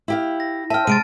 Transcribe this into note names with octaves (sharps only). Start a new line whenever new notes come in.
E4 G4 F5
A#6
E5 G5 A5 F6
C3 G#3 A6 D7 D#7